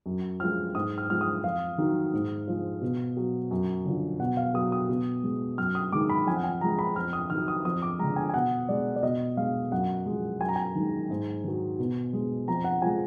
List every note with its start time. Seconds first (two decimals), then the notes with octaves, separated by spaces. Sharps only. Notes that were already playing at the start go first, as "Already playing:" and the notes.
0.06 F#2
0.40 F3 G#3 F6
0.75 G#2 D#6
0.98 F6
1.10 F3 G#3 F6
1.21 D#6
1.44 F2 F5
1.78 D#3 F#3
2.13 G#2
2.48 F3 G#3
2.82 B2
3.17 F#3
3.51 F#2
3.85 D3 F3
4.19 B2 F#5
4.37 F5
4.54 F#3 D#6
4.72 D#6
4.89 B2
5.23 G#3
5.58 F#2 F6
5.75 D#6
5.92 D#3 G#3 D6
6.10 B5
6.27 F2 G#5
6.36 F#5
6.44 G#5
6.61 F3 G#3 A#5
6.79 B5
6.95 F2 F6
7.13 D#6
7.30 D#3 F#3 F6
7.48 D#6
7.65 F2 D#6
7.82 D6
7.99 D3 G#3 A#5
8.16 G#5
8.29 G#5
8.34 B2 F#5
8.69 G#3 D5
8.96 D5
9.03 B2 D#5
9.37 G#3 F5
9.72 F#2 F#5
10.06 F3 G#3
10.41 F#2 G#5
10.48 A#5
10.56 G#5
10.75 D#3 G#3
11.10 G#2
11.44 D#3 F#3
11.79 B2
12.13 G#3
12.48 F2 A#5
12.64 F#5
12.82 F3 G#3 G#5